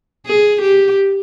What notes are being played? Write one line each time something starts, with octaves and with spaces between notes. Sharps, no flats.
G#4
G4